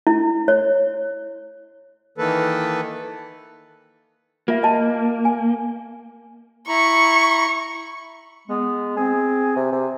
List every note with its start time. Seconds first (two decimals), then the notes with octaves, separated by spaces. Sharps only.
0.07 E4
0.48 C#5
2.18 D#3 E3 A#3 A4 B4
4.48 A#3 F4 E5
4.63 D#5 A5
5.25 G#5
6.68 E4 A#5 B5 C#6
8.47 G#3 B3
8.97 C4 G#4
9.56 C3
9.72 C3